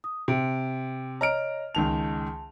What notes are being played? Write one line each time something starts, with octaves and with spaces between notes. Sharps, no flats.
D#6
C3 G5 D7
C#5 D#5 A#5 F6 D7
C#2 D#3 A5 F7